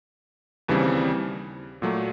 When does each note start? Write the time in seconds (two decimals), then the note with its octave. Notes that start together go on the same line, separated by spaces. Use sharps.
0.68 D#2 C#3 E3 G3 C4
1.82 A#2 F#3 A3